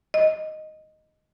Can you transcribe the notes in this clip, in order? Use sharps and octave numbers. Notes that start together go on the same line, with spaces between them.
D#5